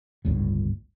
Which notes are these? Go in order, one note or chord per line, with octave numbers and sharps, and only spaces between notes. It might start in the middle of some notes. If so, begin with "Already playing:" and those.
G1 C#2 A2